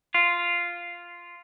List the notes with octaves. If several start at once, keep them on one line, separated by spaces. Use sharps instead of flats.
F4